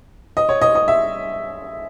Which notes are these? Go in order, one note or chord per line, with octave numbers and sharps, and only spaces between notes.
D#5
C#5
D#5
D#5
E5